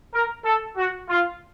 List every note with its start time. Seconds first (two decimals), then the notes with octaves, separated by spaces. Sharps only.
0.13 A#4
0.44 A4
0.76 F#4
1.08 F4